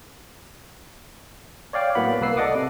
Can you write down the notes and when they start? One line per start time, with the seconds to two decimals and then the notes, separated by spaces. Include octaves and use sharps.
1.73 C#5 D5 F5 G5
1.95 A2 F#3 A#3 B3 F#5 B5
2.21 C2 A#3 B4 E6 C7
2.36 A4 D5 D#5 F#5 D6 D#6
2.55 C3